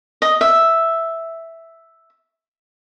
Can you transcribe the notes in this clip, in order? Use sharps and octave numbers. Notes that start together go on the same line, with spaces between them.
D#5
E5